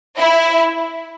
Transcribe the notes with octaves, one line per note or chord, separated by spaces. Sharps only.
E4